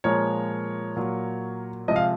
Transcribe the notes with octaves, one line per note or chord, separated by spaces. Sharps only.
A#2 F3 G#3 A#4 C#5
A#2 F#3
C3 F3 G#3 D#5
F5